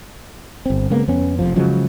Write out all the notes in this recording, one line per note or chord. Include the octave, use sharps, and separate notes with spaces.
G1 C4
C#3 G#3 A#3 B3
F2 B3 C#4
F1 F2 F3
C#3 F3 F#3 G#3